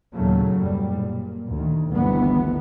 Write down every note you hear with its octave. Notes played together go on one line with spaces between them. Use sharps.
D#2 A#2 C#3 F#3 A3
F#1 B2 G3
A#2
D2 D#3
G1 D2 C3 D#3 E3 B3